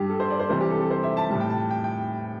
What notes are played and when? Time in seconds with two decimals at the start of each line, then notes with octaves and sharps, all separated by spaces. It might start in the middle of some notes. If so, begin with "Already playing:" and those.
Already playing: G2 G3 G4
0.10 A4
0.20 C5
0.30 D5
0.40 C5
0.50 C3 E3 G3 C5
0.61 G4
0.70 A4
0.80 A4
0.90 C5
1.03 E5
1.17 A5
1.30 A2 G3 A5
1.40 G5
1.50 A5
1.71 G5
1.84 G5